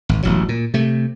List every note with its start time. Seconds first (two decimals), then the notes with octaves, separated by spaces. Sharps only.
0.09 G#1
0.23 E1 A1 F#3
0.49 A#2
0.74 C3 A3